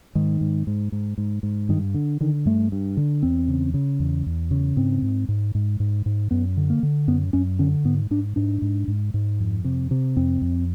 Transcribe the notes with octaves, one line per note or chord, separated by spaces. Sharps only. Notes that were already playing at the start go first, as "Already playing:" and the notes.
G#2 D#3
G#2
G#2
G#2
G#2
G#2
G2 D#3
D3
D3 D#3
G2 A3
G2
D3
E2 C4
C#3
C#3
E2
E2
C#3
G#2 C4
G#2
G#2
G#2
G#2
G#2
F#2 B3
D3
A#3
D3
F#2 B3
F#2 C#4
D3 C#4
G#2 B3
G#2 D4
G#2 D4
G#2
G#2
G#2
F2
C3
C3
F2 C4
F2